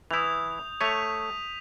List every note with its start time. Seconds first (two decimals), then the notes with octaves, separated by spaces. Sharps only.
0.11 E3 E4 D#6 G6 F7
0.81 A3 C#5 B6 D#7 F7